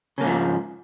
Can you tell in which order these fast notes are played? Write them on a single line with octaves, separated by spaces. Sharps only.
C#3 A#3 G#2 F3